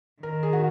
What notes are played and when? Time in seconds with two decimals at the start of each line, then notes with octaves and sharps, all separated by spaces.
0.22 D#3 A#4
0.43 G#4
0.53 F#4